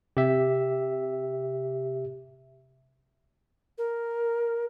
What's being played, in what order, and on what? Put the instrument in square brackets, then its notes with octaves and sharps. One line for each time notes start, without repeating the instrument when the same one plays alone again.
[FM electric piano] C3 [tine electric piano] G4 E5
[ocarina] A#4